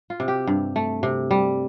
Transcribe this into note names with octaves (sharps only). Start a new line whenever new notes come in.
F4
C3
G4
G2
A3
C3
G3